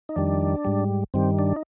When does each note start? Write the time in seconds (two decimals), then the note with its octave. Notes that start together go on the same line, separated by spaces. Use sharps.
0.09 D#4
0.16 F2 D#3 G3 D4
0.65 G#2 G3
1.14 G2 D#3 G3 C4
1.39 D4
1.56 D#4